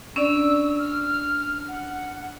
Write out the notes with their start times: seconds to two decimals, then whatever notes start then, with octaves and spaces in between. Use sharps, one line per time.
0.16 C#4 D4 D5 E6
0.79 F6
1.68 F#5